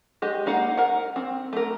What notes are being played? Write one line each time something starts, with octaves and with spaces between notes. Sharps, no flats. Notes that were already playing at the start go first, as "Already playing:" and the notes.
G#3 G4 D#5
A#3 D#4 F5 F#5
A#4 F#5
C4
A3 A#4